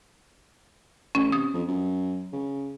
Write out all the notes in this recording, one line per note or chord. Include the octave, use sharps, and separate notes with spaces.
A1 C#4
C3 D#6
F2
F#2
C#3